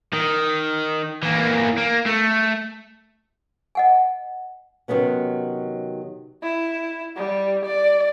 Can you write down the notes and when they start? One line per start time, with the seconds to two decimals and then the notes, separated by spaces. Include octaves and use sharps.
0.14 D#3
1.23 E3 A#3
1.78 A#3
2.06 A3
3.75 D#5 F#5 G#5
4.88 C3 D#3 F#3 B3 C#4
6.43 E4
7.16 G3
7.65 D5